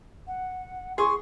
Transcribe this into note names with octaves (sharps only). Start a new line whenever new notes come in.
F#5
G#4 C6 C#6